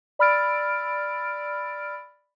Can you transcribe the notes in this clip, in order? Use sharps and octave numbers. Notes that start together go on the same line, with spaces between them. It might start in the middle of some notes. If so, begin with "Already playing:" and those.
D5 B5 E6 F6 A6 D7